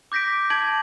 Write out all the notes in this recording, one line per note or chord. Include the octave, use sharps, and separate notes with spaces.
D6 G6 A#6 B6 D7
A5 G#6 D7 F#7